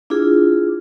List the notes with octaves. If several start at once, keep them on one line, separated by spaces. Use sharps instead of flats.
D4 E4 F4 G#4